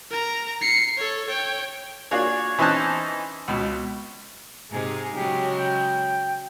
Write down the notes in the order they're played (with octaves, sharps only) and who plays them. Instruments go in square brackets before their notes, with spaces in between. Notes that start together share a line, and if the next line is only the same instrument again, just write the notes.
[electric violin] A#4 A#5
C7 C#7
A4 C#5
C#5 G5
[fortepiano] A#3 D4 F4 F#4 G#4 C#5
E3 C#4 D#4 C5 A5 F#6
C#2 B2
[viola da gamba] G#2 C3 D#4 [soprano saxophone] G#4
[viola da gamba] C#3 F#3 G#3 [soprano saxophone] G4
[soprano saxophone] G5